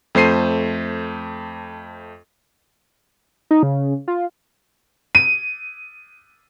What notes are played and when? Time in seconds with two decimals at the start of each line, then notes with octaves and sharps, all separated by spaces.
0.15 F2 A3 C5 C7 D#7
3.51 D#4
3.63 C#3
4.08 F4
5.15 D#7